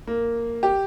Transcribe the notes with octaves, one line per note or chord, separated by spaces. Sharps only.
A#3
G4